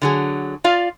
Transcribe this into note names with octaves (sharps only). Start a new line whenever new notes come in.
D3 F#3 G#4
F4 D5 F5